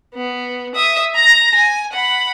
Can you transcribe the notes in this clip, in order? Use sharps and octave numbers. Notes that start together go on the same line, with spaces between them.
B3
E5 D#6
A#5 A#6
G#5
F#5 B5